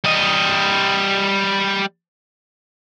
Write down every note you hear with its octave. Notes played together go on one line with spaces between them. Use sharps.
G3 D#5